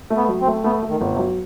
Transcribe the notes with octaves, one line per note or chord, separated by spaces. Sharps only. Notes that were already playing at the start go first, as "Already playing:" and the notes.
A3
B3
F#3
C4
A3
A3 B3
A3
D#3
G1
C3
F#3